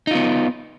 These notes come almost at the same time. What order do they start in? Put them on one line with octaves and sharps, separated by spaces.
D#4 F4 B3